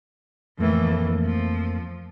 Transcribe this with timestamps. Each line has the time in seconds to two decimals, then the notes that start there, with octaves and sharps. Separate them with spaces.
0.59 F2 A2 E3 A3 A#3
1.25 F3